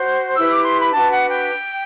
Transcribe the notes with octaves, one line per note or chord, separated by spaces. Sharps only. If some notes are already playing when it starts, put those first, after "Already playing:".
Already playing: F#4 C5 G6
E4 G4 B4 E6
D6
C6
B5
D4 F#4 B4 A5
F#5
G5